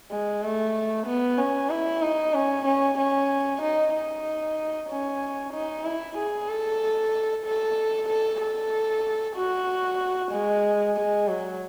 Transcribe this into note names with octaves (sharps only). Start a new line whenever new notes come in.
G#3
A3
B3
C#4
E4
D#4
C#4
C#4
C#4
D#4
D#4
C#4
D#4
E4
G#4
A4
A4
A4
A4
F#4
G#3
G#3
F#3